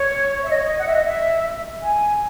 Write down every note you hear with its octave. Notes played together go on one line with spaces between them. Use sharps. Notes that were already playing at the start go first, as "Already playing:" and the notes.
Already playing: C#5
E5
D#5
C#5
D#5
F#5
E5
D#5
E5
G#5